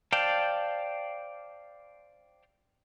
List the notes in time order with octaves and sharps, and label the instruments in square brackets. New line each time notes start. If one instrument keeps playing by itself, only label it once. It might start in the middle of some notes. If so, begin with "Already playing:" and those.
[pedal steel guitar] C5 D5 F5 G5 A5